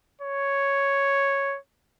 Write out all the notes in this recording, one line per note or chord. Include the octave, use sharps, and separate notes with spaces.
C#5